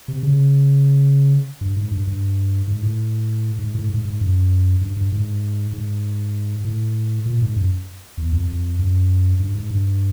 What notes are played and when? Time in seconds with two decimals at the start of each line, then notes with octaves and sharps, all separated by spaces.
0.08 C3
0.23 C#3
1.61 G2
1.76 G#2
1.92 G2
2.07 G2
2.67 G#2
2.83 A2
3.59 G#2
3.75 A2
3.90 G#2
4.05 G#2
4.21 F#2
4.81 G2
4.97 G2
5.12 G#2
5.73 G#2
6.65 A2
7.26 A#2
7.42 G#2
7.56 F#2
8.17 E2
8.33 F2
8.48 F2
8.79 F#2
9.40 G2
9.55 G#2
9.70 G2